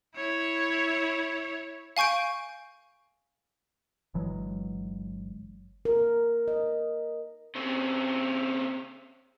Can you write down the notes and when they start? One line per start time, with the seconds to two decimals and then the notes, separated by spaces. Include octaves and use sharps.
0.17 E4 C#5
1.97 F5 G#5 C#6 G6 D7
4.14 G1 E3 F#3 G#3
5.85 A#4
6.48 D#5
7.55 C#3 C4